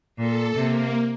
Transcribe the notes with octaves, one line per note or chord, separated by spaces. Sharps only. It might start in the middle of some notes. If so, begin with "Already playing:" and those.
A#2 A4
C3 A#3